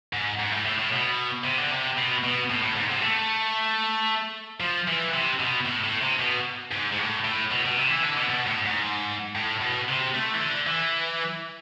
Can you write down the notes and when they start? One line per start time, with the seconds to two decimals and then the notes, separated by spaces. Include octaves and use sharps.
0.13 G#2
0.39 G#2
0.51 A2
0.65 A2
0.78 A2
0.92 B2
1.44 C3
1.58 D3
1.72 C3
1.97 B2
2.24 B2
2.50 A2
2.63 A2
2.76 G#2
2.90 C3
3.02 A3
4.61 F3
4.88 E3
5.14 C3
5.40 B2
5.66 A2
5.84 A2
6.02 C3
6.19 B2
6.72 G#2
6.92 G#2
6.98 A2
7.24 A2
7.51 B2
7.65 B2
7.77 C3
7.90 E3
8.03 D3
8.17 B2
8.29 B2
8.47 A2
8.65 G#2
9.35 A2
9.62 B2
9.89 C3
10.14 A3
10.34 E3
10.41 D3
10.67 E3